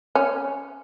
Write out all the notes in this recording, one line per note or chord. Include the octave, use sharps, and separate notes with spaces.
C#4